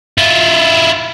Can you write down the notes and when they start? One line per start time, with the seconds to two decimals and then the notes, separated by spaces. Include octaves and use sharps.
0.18 E4 F4